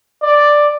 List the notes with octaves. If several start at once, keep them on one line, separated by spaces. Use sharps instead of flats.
D5